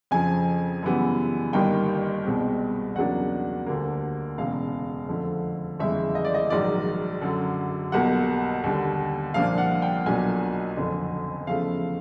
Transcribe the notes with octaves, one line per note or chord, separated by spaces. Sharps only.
F2 C#3 F3 G#5
F#2 C#3 E3 G3 B3
G1 G2 D#3 G3 A#3 G5
C2 B2 G#3 C4
E2 C#3 F#3 A#3 D4 F#5
D2 D3 G3 A#3
E1 E2 C#3 F5
F2 D3 F3 A3
G1 F2 C#3 E3 G#3 E5
D#5
D5
D#5
A#1 G#2 D#3 F#3 D5
F#2 D3 F#3
B1 B2 G3 A#3 F#5
D#2 D3 G3
C2 A#2 F3 A#3 D4 F5
F#5
G5
B1 A#2 F#3 A#3 D4 G#5
F#1 F2 D3
E2 C#3 F3 A3 F5